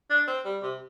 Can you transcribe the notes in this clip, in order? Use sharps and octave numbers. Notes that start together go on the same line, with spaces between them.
D4
C4
G3
C3